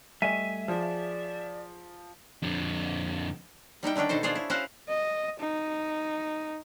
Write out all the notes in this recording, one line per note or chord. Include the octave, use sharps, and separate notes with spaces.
G3 A3 D#5 E5 G#5 D#7
F3 G#4 D5
F2 D3
G3 D#4 E4 G5
D3 D#3 C#4 D4 G5
B2 D#4 A4 C5
D4 F4 G#4 C5 C#5
E4
C#4 E4 F#4 C5 F5 F#5
D#5
D#4